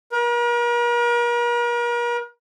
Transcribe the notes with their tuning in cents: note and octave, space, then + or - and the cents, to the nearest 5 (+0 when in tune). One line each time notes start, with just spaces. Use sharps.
A#4 +40